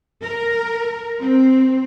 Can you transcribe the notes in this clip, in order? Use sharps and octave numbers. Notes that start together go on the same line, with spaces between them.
A#4
C4